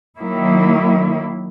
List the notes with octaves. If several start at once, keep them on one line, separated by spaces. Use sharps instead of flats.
D#3 F#3 A#3 E4